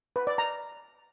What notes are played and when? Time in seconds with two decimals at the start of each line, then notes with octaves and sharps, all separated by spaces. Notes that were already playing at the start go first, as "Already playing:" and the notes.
0.16 B4
0.27 D5
0.38 A#5